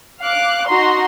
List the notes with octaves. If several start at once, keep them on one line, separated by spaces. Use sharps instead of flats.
F5 D6 F#6
D#4 F#4 A#5 C6